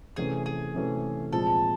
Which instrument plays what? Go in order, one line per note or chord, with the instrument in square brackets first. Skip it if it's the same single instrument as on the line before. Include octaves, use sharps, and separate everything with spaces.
[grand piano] C3 E3 A3 C#4 [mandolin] G#4
[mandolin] G#4
[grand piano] C3 E3 A3 C#4
[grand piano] A#2 F3 G#3 C4 [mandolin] A4